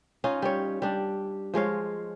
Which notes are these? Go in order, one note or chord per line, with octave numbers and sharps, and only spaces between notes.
C#4 D#4 F4
G3 C#5
G3 D4
F3 G#3 C#5 F5